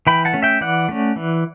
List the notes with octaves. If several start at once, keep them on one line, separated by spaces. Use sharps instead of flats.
E3 G5 B5
F#5 A5
A3 C#4
E5 G5
E3 D5 F#5
A3 C#4
E3